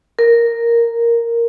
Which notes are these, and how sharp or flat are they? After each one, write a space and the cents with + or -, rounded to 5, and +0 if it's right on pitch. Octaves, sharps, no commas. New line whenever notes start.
A#4 -5